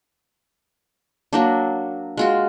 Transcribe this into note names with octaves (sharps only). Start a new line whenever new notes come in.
F#3 A#3 D4
G#3 F4 F#4